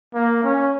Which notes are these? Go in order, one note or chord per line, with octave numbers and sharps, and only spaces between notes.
A#3
C#4